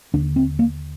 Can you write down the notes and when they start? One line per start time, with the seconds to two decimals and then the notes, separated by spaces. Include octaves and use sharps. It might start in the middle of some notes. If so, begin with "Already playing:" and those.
0.14 D#2 D3 D4
0.36 C4
0.59 A#3